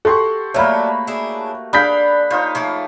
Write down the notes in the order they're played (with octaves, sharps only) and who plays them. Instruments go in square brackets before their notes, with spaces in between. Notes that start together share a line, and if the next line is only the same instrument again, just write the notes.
[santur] F#4 G4 [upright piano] A4 C6 C#6
[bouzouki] F#3 D4 [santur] A3 A#3 A#4 [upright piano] C#5 B5
[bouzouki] D4 E4 G#4
[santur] D4 G#4 F5 [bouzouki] D5 [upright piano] B5 G6 B6
[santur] D#4 F4 C5 [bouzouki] C#5
[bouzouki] F3 A3 A#3 [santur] C#5